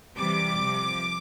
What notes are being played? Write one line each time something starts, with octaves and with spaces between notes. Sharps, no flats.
C3 E3 G3 D6
C3 F3